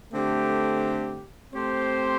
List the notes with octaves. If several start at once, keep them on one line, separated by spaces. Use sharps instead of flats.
D3 A3 C4 G4
A3 C4 G4 C5